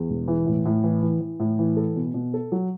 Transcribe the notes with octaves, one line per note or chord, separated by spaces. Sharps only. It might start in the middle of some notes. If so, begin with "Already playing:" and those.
Already playing: E2
E1
E3
A2
A2
E3
E3
E3
A2
E3
A4
B2
B2
A4
F#3